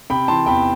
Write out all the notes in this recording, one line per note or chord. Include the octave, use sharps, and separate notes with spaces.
C3 G5 B5
E3 A5 C6
E2 G5 B5